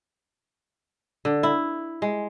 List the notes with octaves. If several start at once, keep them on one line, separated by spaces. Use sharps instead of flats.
D3
E4
G#3